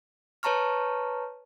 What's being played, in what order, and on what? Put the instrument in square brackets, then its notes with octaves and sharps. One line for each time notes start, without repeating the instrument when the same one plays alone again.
[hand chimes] B4 C#5 A5 A#5 C#6 F6